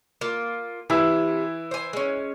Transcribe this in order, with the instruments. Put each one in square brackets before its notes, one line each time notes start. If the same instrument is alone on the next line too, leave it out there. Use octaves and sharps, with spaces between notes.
[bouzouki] A#3 F4
[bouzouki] C3 [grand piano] E3 E4 E6
[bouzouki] C5 G#5
G#3 C#4